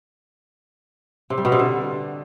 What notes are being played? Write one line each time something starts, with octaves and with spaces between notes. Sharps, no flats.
C3
G3
B2
C3
D3